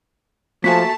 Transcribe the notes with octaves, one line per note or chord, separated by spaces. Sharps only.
F3 A3 A#3 F#4 G#5 A5 B6